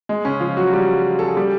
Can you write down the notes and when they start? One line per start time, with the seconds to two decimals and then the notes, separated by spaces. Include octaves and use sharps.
0.09 G#3
0.25 C#3 C#4
0.40 F3 F4
0.57 F#3 F#4
0.73 G3 G4
1.19 A4
1.28 G#4
1.37 G3 G4